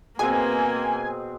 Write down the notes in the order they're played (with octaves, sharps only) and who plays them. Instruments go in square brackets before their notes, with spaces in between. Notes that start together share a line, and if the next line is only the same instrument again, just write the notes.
[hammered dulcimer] B2 [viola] A#3 [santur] C4 G#4 [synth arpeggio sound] G#5